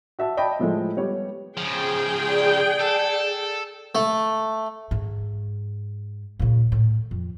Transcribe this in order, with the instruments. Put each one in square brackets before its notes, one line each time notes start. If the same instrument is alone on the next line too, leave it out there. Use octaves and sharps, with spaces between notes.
[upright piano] F#4 E5 A5
D5 D#5 G5 A5 B5
A2 F3 G#3 A4
G3 B3 C#5
[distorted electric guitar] C#3 F3 [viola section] G#4 G5
[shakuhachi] D5
[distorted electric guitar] A4
[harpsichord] A3
[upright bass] G#2
A#2 C#3
A2
F2